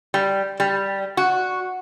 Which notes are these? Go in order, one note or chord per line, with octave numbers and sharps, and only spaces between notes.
G3
G3
F#4